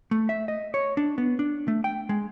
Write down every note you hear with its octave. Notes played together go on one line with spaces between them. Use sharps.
A3
E5
D#5
C#5
D4
B3
D4
A3
G5
G#3